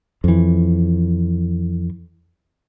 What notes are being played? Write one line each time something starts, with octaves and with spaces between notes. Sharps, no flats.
F2 E3